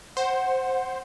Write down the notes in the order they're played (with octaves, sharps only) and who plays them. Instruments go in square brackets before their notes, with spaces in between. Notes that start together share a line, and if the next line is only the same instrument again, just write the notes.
[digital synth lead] C5 [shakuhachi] F#5